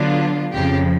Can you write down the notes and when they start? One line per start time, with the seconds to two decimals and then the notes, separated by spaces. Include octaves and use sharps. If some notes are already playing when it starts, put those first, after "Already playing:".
Already playing: D3 F#3 B3 D4 F4
0.53 F2 C#3 F3 G4